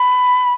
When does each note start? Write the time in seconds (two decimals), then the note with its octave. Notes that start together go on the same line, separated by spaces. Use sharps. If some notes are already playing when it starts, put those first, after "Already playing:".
Already playing: B5